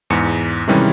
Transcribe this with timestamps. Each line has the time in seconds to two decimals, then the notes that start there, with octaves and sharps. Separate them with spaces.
0.10 E2 G#2 C#7
0.68 C3 D#3 E3 G3 G#3 C#4